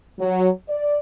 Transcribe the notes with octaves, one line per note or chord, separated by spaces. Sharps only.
F#3
D5